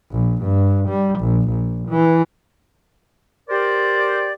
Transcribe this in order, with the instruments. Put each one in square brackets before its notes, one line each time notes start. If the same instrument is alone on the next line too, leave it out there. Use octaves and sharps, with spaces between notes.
[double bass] A#1
G2
G3
A#1
A#1
E3
[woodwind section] G4 A#4 C5 D5